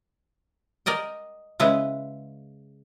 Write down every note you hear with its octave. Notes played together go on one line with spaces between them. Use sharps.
A#4 D5 D#5 G5
C#3 G#3 E4 B4